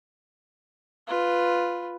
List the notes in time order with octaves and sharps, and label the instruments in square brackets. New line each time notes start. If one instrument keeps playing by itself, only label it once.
[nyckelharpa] F4 B4